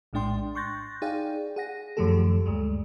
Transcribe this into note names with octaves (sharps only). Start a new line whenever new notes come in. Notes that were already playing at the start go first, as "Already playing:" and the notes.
A#1 A2 G#3 D4 G5 C6
C6 C#6 F#6 G6 A6 A#6
D#4 G#4 D5 F5 G5
G#4 F#5 A#6
F#2 D#3 F3 A3 G4 A4
D2 G2 G#3 A3